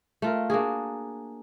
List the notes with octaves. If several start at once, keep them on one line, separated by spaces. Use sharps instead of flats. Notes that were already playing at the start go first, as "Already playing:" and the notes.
A3 F4 A#4
A#3 D4 F#4 G#4